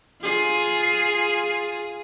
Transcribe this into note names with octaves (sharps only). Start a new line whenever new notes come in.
F4 G#4